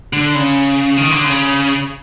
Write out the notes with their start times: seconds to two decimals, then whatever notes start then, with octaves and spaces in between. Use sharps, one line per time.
0.13 D3
0.35 C#3
0.97 D#3
1.11 D3
1.24 C#3